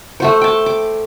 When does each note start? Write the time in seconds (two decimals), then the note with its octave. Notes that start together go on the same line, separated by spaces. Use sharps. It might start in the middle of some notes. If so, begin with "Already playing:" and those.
0.20 A3 F#4 C5
0.41 G5 A5
0.66 D6